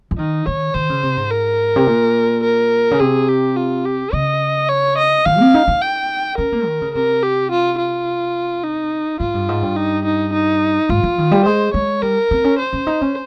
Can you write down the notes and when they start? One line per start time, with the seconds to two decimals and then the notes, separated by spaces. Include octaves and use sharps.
0.11 F3
0.19 D#3 D#4
0.46 D#3 C#5
0.74 D#3 C5
0.89 C#3
1.03 C3
1.17 G#2
1.31 A#4
1.76 C3
1.87 A#2
2.44 A#4
2.91 C#3
3.00 C3 G#4
3.28 G4
3.56 F4
3.85 G4
4.13 C#3 D#5
4.69 C#5
4.98 D#5
5.26 D#3 F5
5.40 C4
5.54 D#4
5.68 D#4
5.82 G5
6.38 C#4 A#4
6.52 A#3
6.66 D#3
6.82 C#3
6.95 C3 A#4
7.23 G4
7.52 F4
7.79 F4
8.64 D#4
9.20 G#2 F4
9.34 G2
9.49 G#2
9.62 G2
9.76 D#4
10.05 D#4
10.33 D#4
10.89 G#2 F4
11.03 F3
11.18 D#3
11.31 G3
11.46 G#3 C5
11.74 G#3 C#5
12.03 G3 A#4
12.31 C4
12.44 C#4
12.59 C5
12.73 C#4
12.87 D#4
13.02 C#4